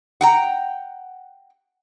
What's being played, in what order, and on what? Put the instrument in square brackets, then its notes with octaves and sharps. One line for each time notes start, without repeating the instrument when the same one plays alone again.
[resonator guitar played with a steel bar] F#5 G5 A#5